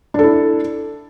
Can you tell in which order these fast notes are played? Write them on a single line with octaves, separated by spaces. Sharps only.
D4 A4 E4